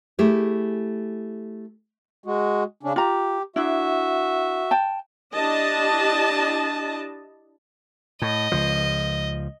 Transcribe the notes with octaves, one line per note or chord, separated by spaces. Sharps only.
A3 E4 G4 G#4
G#3 F#4
C#3 C#4 D4
F4 G4 A#5
D4 E4 F#4 E5
G5 A5
D4 E4 G4 D#5 A5
A2 D#5
C#2 F3